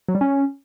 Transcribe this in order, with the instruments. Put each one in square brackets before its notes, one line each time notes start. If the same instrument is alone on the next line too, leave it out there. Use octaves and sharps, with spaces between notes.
[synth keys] F#3
G3
C#4